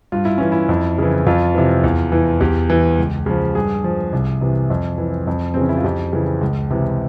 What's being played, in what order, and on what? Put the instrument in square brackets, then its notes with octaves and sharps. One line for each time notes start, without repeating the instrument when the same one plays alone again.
[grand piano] G2 F4
E4
E3 C#4
E4
F2
C#3 E3
F2 F4
C3 E3
E2
E3
E2 G4
E3
C#2
C#3 F3
G2 G#4
F3
C2
C3 E3
F2
E3
F2
C#3 E3 C4
C#4
E4
F4
F2 G4
C#3 E3
C#2
C3 E3